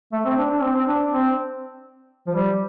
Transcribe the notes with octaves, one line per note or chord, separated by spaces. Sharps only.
A3
C4
D4
D4
C4
C4
D4
C4
F3
G3